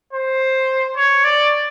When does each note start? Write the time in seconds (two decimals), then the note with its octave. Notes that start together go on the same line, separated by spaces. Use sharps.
0.13 C5
0.96 C#5
1.24 D5